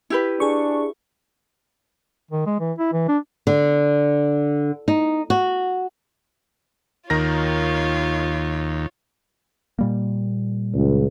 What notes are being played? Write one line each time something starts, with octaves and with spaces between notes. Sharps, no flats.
E4 G4 B4
D4 G#4 C#6
D#3
G#3
E3
E4
E3
D4
D3
D#4
F#4
D#2 D#3 F4 A#4 C#5 A#6
A#2 G3 A#3
C#2